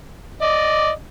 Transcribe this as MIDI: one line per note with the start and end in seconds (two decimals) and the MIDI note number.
0.42 0.90 74
0.42 0.90 75